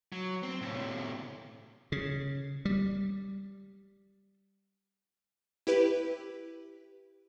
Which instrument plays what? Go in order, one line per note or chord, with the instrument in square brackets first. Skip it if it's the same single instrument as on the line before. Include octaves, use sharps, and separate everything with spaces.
[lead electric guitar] F#3
C4
A2 C3
[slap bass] C#3
G3
[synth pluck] E4 G4 B4